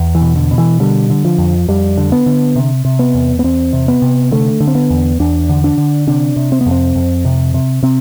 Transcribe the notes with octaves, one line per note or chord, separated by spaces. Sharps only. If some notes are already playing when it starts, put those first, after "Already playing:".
Already playing: E2
E3
B2
D3
B2
E3
D3 G3
D3
F3
F2
F2 G3
D3
B3
D3
C3
C3
B3
E2
B3
E2 C4
C3
B3
C3
D3 A3
D3
C4
B3
E2
E2 D4
D3
D4
D3
C3 D4
C3
C4
B3
F2
C4
F2
C3
C3
C3 C4